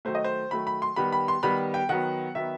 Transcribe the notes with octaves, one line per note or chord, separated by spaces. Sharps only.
D#3 F#3 A3 C5
D#5
C5
D#3 F#3 A3 B5
B5
C6
D#3 G3 B3 B5
B5
C6
D#3 G3 B3 B5
G5
D#3 F#3 B3 F#5
D#3 F#3 B3 E5